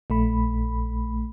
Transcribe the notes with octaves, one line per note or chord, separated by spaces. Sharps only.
A#1 A3 B5